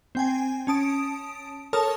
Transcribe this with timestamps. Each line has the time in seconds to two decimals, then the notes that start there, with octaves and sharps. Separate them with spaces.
0.15 C4 G5 G#5
0.67 C#4 A5 D#6 D7
1.73 A4 A#4 C#5 A5 D#6 F6